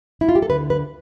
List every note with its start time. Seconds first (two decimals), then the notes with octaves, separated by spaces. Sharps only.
0.21 E4
0.29 F4
0.35 G4
0.42 A4
0.50 D2 D3 B4
0.70 B4